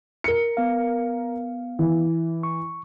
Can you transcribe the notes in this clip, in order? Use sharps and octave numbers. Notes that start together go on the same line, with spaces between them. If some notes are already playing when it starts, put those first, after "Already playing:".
A#4 C#7
B3 F5
E3
C#6